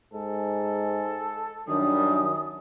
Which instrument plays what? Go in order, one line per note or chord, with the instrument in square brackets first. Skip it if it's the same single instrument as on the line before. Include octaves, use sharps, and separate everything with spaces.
[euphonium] G#2 [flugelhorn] A4
[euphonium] F#2 [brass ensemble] D#3 G3 D4 [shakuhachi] D#6